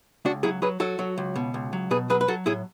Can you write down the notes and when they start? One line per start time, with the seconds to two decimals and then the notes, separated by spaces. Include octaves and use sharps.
0.25 C#2 D4 F#4
0.43 F#3 E4 G#4
0.62 F#3 G#4 B4
0.80 F#3 F#4 A4
0.99 F#3
1.18 C#2
1.36 B2
1.54 C#2
1.73 F#3
1.91 B2 G#4 B4
2.10 F#3 G#4 B4
2.21 B4
2.28 F#3 F#4 A4
2.46 A2 E4 G#4